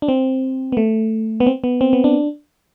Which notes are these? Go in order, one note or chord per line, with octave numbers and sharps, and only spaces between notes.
D4
C4
B3
A3
B3
C4
B3
C4
B3
D4